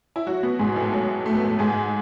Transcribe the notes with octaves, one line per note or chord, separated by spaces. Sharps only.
E4
F#3 F#4
B2 B3
G#2 G#3
A2 A3
F#3
A3
B3
A2 A3
G#2 G#3